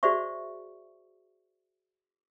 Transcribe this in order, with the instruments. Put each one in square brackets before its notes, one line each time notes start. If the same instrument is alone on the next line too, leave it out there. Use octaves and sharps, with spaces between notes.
[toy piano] F#4 G#4 C5 D5 E5 C#6